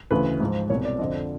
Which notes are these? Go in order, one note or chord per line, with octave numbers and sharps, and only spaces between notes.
D2 C#3 E3 B4
G#2 F3
C2 B2 C#5
D5
F2 D3 F3 D#5